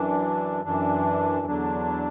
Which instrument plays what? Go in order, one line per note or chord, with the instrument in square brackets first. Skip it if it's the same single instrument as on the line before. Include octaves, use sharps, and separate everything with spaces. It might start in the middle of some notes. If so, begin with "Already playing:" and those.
Already playing: [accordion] F#2 E3 D4
F#2 E3 D4
E2 D3 F#3 D4